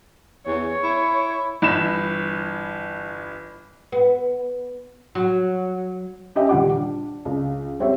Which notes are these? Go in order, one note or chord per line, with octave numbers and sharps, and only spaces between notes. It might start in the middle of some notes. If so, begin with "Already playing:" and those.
E2 C#5
E4
G1 E3 B5 E7
B3
F#3
C#4 G4 D#5 E5
D#1 G3 F4 F#5 D6
D4
C#2
G3 C4 C#5 E5